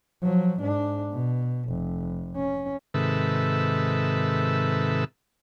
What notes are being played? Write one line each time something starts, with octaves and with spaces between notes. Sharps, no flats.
F3 F#3
G#2 D4
B2
F1
C#4
G#2 C3 D#3 A4 B4 E5